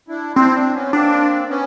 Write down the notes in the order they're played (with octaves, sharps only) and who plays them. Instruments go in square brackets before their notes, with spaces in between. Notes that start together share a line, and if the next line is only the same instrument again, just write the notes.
[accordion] D4 E4
[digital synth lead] C4 [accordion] D4 E4
[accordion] C4 D4
B3 C#4
[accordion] A#3 C4 [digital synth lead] D4
[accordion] B3 C#4